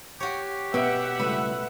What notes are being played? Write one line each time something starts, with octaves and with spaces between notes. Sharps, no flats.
F#4 G4 C#5
B2 B3 E5 F#5
C#2 G2 A3 B4